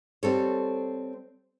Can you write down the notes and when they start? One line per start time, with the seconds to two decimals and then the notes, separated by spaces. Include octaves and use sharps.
0.23 G3 C4 A4 C#5